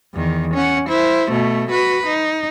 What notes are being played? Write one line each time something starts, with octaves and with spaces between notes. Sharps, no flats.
E2 D#3
C#4 F#5
E4 C5
B2 A3
F#4 B4
D#4